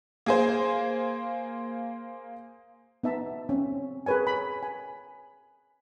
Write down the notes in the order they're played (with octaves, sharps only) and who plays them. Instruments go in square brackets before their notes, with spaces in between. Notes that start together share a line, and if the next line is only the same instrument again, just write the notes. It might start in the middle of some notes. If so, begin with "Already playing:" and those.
[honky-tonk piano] A#3 G#4 C5
[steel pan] B3 D#4 E5 A5
C4 C#4
G#4 A#4 B4 C#5 G#5
B5
G#5